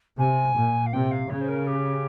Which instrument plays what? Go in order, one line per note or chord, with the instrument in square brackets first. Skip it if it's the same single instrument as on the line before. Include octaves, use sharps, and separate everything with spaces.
[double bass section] C3 [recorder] G#5
[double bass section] A#2
[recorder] F5
[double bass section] C3 [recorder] G5
[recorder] F5
[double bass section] C#3 [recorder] C#5
[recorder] C5
A#4
G4